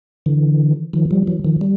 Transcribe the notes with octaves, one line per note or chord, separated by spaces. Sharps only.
D3 E3
D#3 F3
F3 G3
E3 F#3
D#3 F3
G3